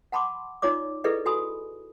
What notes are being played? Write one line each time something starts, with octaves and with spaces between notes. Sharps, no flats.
F#5 A5 B5 C6 D6
D#4 F4 C#5 D5 D6
E4 G#4 A4 B4 D5 D#5
F#4 A4 G#5 B5 D#6